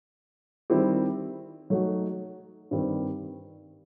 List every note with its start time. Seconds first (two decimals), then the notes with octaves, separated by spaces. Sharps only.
0.70 D#3 G3 C4 E4 G4
1.70 F#3 A3 D#4 F#4
2.71 G2 D#3 G3 C4